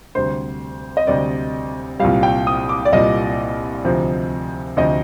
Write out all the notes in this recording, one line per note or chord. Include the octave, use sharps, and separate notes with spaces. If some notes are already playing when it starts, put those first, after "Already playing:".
D2 C3 G3 C5
D#5
D2 C3 G3 D5
C2 A#2 G3 F5
G5
D#6
D6
D5
C2 A#2 G3 D#5
D2 C3 F3
D2 C3 F3 D#5